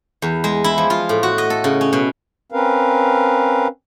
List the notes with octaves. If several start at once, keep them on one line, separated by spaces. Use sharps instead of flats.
E2
G#3
E4
F3
F4
A2
F#4
D#5
A4
C#3
C#4
B2
C4 C#4 A#4 B4 F5